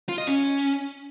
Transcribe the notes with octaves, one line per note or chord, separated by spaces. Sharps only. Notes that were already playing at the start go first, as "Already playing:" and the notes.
F4
D#5
C#4